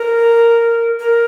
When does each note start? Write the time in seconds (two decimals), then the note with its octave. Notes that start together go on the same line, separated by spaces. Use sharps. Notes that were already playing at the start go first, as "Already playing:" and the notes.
Already playing: A#4
1.00 A#4